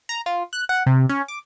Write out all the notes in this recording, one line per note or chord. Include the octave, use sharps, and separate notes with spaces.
A#5
F4
F#6
F#5
C3
C#4
D6